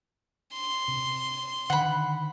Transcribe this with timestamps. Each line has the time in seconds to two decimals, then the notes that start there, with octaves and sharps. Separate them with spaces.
0.53 C6
0.88 C3
1.70 D3 D#3 F#5 B5